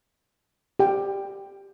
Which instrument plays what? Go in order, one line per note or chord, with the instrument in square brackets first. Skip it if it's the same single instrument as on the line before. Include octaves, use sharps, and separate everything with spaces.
[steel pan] G4 G5